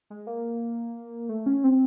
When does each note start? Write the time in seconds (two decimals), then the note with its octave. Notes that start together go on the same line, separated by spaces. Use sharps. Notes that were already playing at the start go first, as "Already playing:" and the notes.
0.10 G#3
0.27 A#3
1.29 A3
1.46 C#4
1.64 C4